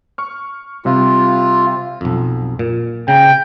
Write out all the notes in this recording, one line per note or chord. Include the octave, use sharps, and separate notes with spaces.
C#6 F6
C3 G3 F4
B1 F2
A#2
C#3 G5 A#5